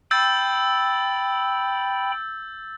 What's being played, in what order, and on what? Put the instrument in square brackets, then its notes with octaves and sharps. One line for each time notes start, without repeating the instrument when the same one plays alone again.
[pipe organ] G5 B5 [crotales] E6 G6 A6